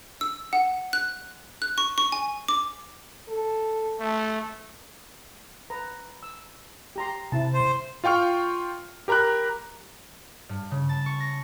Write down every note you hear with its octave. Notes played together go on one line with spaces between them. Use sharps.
E6
F#5
F#6
F#6
C#6
C#6
G#5
D6
A4
A3
B4 A#5
E6
G4 A#5 C6
C3 E4 A5
C5
F4 F5 G5 C#6 F6
G4 A#4 A#5 B5 F#6
G2
C#3
A5
C#6
A#6